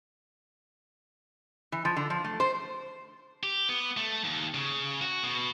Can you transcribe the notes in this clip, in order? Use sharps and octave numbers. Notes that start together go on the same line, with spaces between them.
E3
F3
D3
F3
A3
C5
G4
B3
A3
D#2
C#3
F#4
B2